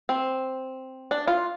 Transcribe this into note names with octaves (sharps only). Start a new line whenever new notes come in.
C4
D4
F4